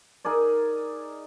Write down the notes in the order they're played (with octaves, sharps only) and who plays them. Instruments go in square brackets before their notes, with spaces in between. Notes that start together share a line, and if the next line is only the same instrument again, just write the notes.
[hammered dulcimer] D#4 G#4 A#4 D5